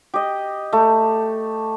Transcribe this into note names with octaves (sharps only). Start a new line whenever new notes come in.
G4 D#5
A3